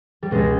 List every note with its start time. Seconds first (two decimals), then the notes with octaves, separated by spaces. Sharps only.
0.23 G3
0.31 C#2 B2 G#3